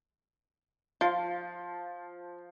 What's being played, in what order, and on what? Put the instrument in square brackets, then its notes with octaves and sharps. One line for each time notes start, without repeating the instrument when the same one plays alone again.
[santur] F3 [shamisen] F4